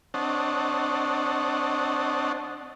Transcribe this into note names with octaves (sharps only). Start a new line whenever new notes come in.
C4 D4 C#5 D#5 F#5 A5